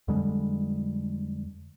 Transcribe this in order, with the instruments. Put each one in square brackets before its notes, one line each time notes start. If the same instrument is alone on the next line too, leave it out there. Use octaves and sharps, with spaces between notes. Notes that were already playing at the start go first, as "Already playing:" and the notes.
[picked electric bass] F2 D3 G3 G#3